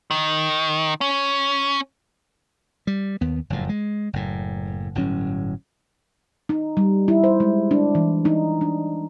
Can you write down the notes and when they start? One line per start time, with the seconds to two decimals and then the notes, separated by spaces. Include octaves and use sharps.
0.11 D#3
1.01 C#4
2.87 G3
3.21 D#2 B3
3.50 F#1 F2 A2
3.69 G#3
4.13 F#1 A2
4.95 G1 A2 F#3 C#4
6.49 D#4
6.77 G3
7.08 E4
7.24 C5
7.40 G#3
7.71 D4
7.95 E3
8.25 D#4
8.61 D4